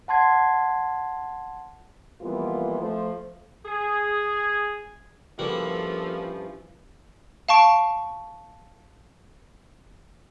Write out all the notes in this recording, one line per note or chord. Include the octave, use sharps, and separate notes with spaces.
F#5 A5 C6 G#6 C7
F2 E3 G3 A#3 B3 F4
F3 A3 C5
G#4
G2 F3 G3 A#3 C#4 E4 F#4 A4
F5 A5 C#6 D7